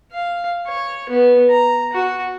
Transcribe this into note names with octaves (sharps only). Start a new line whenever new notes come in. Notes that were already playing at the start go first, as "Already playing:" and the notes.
F5
C#5
B3
A#5
F#4